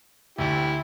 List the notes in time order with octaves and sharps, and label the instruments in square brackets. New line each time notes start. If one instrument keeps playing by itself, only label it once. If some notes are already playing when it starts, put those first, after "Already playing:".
[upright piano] D2 [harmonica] E4 G4